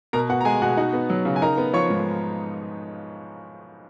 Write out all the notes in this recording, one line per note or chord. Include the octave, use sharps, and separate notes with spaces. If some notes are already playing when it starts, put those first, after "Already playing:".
B2 A#4 A#5
B3 F#4 F#5
A#5
G#3 G#4 G#5
B2 F#4 F#5
D#4 F#4 F#5
B3
F#3
C#3
G#5
D#4 A#4 A#5
B3
F3 C#5 C#6
G#2